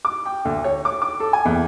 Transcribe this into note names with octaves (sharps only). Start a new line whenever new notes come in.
D6
G5
D2
C#5
D6
D6
A4
G#5
E2